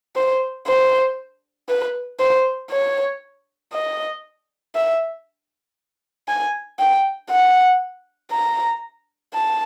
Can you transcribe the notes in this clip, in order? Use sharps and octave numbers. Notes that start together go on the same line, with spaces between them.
C5
C5
B4
C5
C#5
D#5
E5
G#5
G5
F#5
A#5
A5